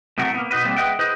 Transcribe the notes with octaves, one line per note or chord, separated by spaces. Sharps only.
A2 C3 F#3 A3 A#4 F#5
A#3 B3
B2 D#4 F#4 B4
G3 A3 A#3 C4
G#4 B4 D#5 E5 F#5 G5
E4 G#4 B4 C5 D#5